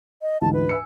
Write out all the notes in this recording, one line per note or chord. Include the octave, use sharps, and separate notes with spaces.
D#5
D2 G#2 E3 A5
B4
G#5 E6 C#7